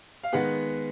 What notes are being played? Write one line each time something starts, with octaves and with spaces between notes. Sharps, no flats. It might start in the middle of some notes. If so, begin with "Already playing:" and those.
F5
D#3 G#3 B3 F#5